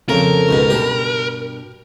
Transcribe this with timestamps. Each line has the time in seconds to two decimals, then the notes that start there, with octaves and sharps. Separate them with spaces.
0.09 F2 C#3 C4 C#4 A4 A#4
0.49 C#2 G#2 B2
0.70 G2 B2 G4 A5